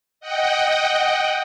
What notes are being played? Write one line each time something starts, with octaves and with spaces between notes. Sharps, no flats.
D#5 F#5 G5